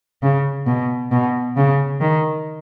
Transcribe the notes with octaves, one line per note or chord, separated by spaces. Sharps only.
C#3
B2
B2
C#3
D#3